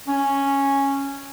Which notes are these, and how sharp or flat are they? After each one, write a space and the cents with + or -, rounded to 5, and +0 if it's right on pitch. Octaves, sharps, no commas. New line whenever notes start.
C#4 -5